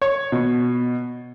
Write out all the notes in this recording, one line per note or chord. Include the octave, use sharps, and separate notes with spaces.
C#5
B2